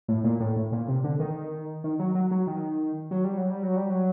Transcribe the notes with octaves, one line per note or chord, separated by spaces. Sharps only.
A2
A#2
A2
A2
A#2
C3
D3
D#3
D#3
F#3
F#3
F#3
D#3
F#3
G3
F#3
G3
F#3
G3
F#3